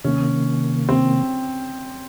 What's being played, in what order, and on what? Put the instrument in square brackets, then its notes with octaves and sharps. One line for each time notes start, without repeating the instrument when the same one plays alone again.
[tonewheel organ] C3 D#3 A#3 [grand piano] C#4
[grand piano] C4